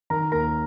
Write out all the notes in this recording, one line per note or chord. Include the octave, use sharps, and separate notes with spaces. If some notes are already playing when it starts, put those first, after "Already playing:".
D#3 A#4 A#5
D#2 A#4 A#5